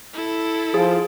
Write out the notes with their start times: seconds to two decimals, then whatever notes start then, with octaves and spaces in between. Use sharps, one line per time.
0.13 E4 A4
0.74 F3 G#4